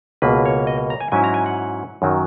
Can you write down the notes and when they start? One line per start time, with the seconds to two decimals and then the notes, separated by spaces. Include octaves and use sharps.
0.22 C#2 B2 A#3 B4
0.45 C#5
0.67 D#5
0.90 A#5
1.00 G#5
1.12 G#2 F#3 C#4 E4 G#5
1.24 A#5
1.34 G#5
1.46 F#5
2.02 F#2 D#3 F#3